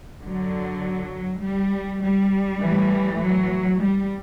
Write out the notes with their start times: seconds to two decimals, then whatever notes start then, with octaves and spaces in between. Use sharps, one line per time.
0.24 F#2 D3 F#3
1.43 G3
2.02 G3
2.61 A2 E3
3.20 F#3
3.80 G3